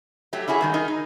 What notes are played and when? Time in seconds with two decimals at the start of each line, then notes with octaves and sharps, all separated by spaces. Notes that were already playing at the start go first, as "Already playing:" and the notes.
0.33 F#3 A3 G4
0.48 C#4 E4 F#4 G#4
0.61 G2 D#3 G#3
0.74 D#4 G#4 A#4
0.88 D#4